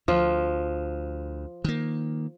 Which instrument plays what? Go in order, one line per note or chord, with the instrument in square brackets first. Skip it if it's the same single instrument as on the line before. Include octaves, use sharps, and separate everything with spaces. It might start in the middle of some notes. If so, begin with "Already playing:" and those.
[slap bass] D2 [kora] F3
[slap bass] D#3 A#3